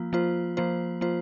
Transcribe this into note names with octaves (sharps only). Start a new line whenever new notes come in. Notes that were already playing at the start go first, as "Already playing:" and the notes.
Already playing: F3 A#3 F4
F3 A#3 F4 C5
F3 A#3 F4 C5
F3 A#3 F4 C5